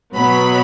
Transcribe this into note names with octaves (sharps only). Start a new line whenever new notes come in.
B2 F#3 B3 B5